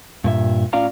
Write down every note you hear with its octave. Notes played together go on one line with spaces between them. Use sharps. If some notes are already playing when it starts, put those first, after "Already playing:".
G2 A#2 E5
A2 C#4 F4 D5 F5 A#5